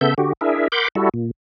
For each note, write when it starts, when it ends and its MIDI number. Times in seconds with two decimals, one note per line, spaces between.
0.01 0.14 49
0.01 0.14 59
0.01 0.14 69
0.01 0.14 76
0.01 0.14 91
0.18 0.33 50
0.18 0.33 66
0.18 0.33 67
0.41 0.68 62
0.41 0.68 64
0.41 0.68 68
0.41 0.68 70
0.41 0.68 76
0.72 0.88 70
0.72 0.88 78
0.72 0.88 83
0.72 0.88 84
0.72 0.88 86
0.72 0.88 91
0.95 1.09 55
0.95 1.09 64
0.95 1.09 66
0.95 1.09 69
1.14 1.31 46